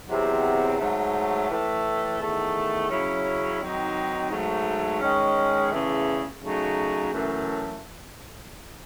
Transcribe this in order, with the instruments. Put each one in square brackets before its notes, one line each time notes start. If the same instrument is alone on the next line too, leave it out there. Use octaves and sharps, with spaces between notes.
[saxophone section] E2 C3 F#3 C4
G#2 F#3 A3
A2 E3 A3
E2 D#3 A3
C#3 F#3 C#4 E4
D#3 F#3 C4 D#4
G#2 F#3 A3
D#3 G#3 C#4
E2 C#3 E3 A3
C#3 F#3 A3 D#4
F#2 E3 A3